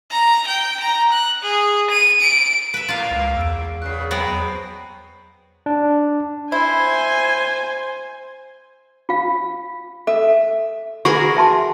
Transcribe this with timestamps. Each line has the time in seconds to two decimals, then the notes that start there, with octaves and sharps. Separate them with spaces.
0.11 A#5
0.47 G5
0.81 A#5
1.13 F#6
1.42 G#4
1.90 D#7
2.21 D7
2.74 B4 E5
2.89 G#2 A#3 F4 F5
3.11 C#2
3.37 E2 E6 D7
3.82 A#2 C#3 B3 F#6 C7
4.11 F#3 G#3 B3 C4 G5 B5 C#6
5.66 D4
6.52 E4 C5 G#5
9.09 F4 F5
10.07 A4 E5
11.05 F#4 G#4 A#4 B4 C#6
11.37 E5 A5 C6